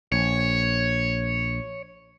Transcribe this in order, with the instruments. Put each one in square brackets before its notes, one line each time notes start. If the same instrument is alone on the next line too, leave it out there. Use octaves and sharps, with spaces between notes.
[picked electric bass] A#1 [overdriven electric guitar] C#5